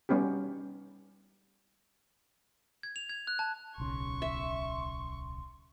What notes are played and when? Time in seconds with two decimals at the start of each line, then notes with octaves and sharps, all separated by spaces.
0.09 G3 B3 C#4 D#4 G4
2.83 G#6
2.96 F7
3.09 G#6
3.27 F#6
3.39 A5
3.78 D1 B1 C#3 C6 C#6
4.22 E5